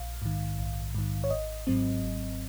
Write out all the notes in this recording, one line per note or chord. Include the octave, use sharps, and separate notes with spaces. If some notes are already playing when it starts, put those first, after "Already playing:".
Already playing: A#1 F5
G#2 D#3
A#1
G#2 D#3
C#5
G#1 D#5
G#2 F#3 C4
G#1